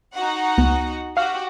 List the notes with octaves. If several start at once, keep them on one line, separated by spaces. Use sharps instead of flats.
D#4 F#4 F#5
C#2 B3
F#4 G4 F5 F6